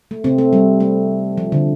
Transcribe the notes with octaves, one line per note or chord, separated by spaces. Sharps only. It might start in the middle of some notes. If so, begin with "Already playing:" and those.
A3
C3 C4
A3
G3
A3
F3
D3